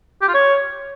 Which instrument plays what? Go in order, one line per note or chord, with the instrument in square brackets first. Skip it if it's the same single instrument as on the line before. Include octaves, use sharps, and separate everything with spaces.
[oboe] G4
F4
C#5